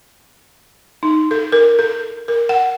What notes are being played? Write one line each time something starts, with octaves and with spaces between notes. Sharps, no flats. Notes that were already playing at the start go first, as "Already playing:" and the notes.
D#4
A4
A#4
A4
A#4
F#5